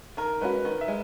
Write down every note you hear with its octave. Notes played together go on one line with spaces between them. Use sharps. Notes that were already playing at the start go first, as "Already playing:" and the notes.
D#3 A#4
G#3 C#4 F#4 B4
D#3
E5
G#3